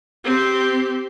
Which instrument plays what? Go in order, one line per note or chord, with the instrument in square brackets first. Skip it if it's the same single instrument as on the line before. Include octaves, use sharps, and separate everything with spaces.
[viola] C4 G4